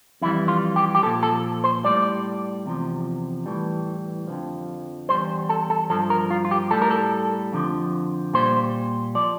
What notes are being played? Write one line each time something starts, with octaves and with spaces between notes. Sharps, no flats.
F2 E3 G3 E4
F4
G4
G4
A#2 F3 A4
A4
C5
A2 G3 D5
E2 C3 F3
A2 E3 G3
F2 D3 F3
E2 C3 G3 C5
A4
A4
G2 F3 A4
A#4
F4
F4
G4
A2 G3 A4
A#4
A4
F2 D3 F3
A#2 G3 C5
F3 D5